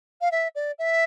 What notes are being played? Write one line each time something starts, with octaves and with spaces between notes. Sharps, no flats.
F5
E5
D5
E5